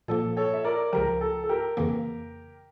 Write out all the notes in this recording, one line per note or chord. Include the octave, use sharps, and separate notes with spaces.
A#2 F3 A#3 A4
A4 C#5
E5
A#4 D5
C#2 C#3 F3 G4 A#4
A4
A4
G4 A#4
F2 C#3 E3 A#3